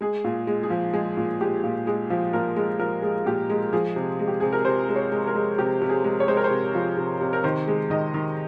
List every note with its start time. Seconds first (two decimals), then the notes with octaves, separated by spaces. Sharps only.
0.01 G#3 G#4
0.24 A#2
0.47 G#3
0.63 G#4
0.70 F3
0.94 G#3 G#4
1.17 A#2
1.41 G#3 G4
1.64 A#2
1.87 G#3 G#4
2.10 F3
2.33 A#2 A#4
2.56 G#3
2.79 F3 A#4
3.02 G#3
3.26 A#2 G4
3.50 G#3
3.73 F3 G#4
3.96 C3
4.19 G#3
4.28 G4
4.40 C3 G#4
4.53 A#4
4.65 C3 C5
4.88 G#3
4.96 C#5
5.12 G#3
5.27 A#4
5.35 G#3
5.58 C3 G4
5.81 C3
5.89 G#4
6.04 G#3
6.20 C#5
6.28 G#3 C5
6.37 A#4
6.44 C5
6.51 C3
6.75 F3
6.97 C3
7.21 C3
7.33 A#4
7.44 D#3 C5
7.68 G#3
7.90 D#3 D#5
8.14 D#3